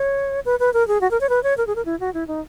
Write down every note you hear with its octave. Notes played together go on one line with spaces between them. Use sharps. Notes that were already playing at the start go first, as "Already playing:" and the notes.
Already playing: C#5
B4
B4
A#4
G#4
F#4
A#4
C#5
B4
C#5
A#4
G#4
A#4
E4
F#4
E4
D#4